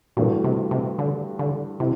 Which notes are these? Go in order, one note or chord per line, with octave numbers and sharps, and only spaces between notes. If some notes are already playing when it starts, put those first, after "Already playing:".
G2 A#2 E3 A3 D4 F#4
C3
C3
D3
D3
C3 E4